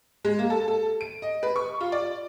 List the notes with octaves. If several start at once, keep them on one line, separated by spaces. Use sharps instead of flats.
G#3
A#3
A4
A4
D7
D#5
B4
C#6
F4
D5